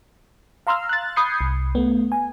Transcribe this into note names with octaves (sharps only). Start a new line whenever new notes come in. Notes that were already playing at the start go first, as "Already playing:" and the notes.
F5 A#5 C6 E6 F6
F#6 A6
B5 D#6 G6 G#6 C7 C#7
C2
A3 B3
G#5